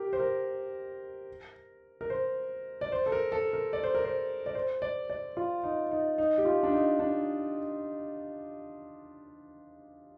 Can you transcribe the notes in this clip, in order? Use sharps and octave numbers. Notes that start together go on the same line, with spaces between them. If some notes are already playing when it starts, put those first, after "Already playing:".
Already playing: G4 A#4
C5
A#4
A#4
C5
D5
C5
A4
A#4
A4
A#4
D5
C5
A#4
C5
D5
C5
D5
D5
F4
D#4
D#4
D#4
G4
F4
D4
D#4
D4